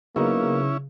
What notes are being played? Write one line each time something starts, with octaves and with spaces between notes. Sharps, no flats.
C#3 F#3 A#3 B3 C#4 D#4 E4